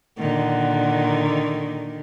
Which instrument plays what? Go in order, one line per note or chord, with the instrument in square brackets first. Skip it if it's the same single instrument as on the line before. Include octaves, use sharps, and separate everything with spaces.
[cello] A#2 [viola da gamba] D3 D#3 [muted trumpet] F#5